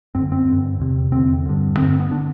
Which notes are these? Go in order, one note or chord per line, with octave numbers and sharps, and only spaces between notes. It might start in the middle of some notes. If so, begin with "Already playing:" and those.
F#2 D3 C4
C4
G2 D3
E2 C3
E2 D3 C4
G2 D3
G2 D3 C4
C4
B3
D3 D4